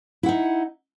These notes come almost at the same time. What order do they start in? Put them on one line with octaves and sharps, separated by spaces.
E4 F#5 D#4